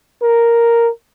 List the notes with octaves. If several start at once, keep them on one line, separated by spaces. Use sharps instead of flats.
A#4